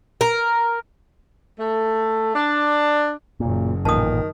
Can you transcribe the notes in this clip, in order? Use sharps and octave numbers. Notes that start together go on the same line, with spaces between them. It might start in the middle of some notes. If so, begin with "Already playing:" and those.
A#4
A3
D4
F#1 A#2
A1 A#2 D#3 A5 D#6